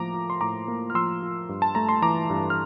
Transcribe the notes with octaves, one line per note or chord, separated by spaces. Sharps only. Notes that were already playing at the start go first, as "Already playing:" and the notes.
Already playing: A2 F3 A#3 A#5 D6
F4
C6
A2 A#5 D6
A#3
F6
F3 C6 E6
F4
G2
A5
A3 A#5
C6
E3 A#5 D6
G2
F6